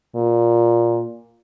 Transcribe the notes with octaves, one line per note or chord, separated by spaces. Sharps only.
A#2